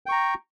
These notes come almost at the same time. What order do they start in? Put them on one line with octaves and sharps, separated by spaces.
G5 C#6 A#5